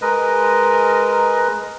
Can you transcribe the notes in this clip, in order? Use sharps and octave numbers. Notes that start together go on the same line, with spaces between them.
G#3 A#4 B4 D#5